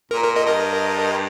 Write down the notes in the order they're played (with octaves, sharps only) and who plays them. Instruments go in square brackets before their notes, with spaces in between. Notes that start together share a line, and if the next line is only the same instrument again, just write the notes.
[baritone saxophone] A#2 [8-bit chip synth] A#4
[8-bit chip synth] A#4
A#4 D#5
[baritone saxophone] G2 [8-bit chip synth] A#4 D#5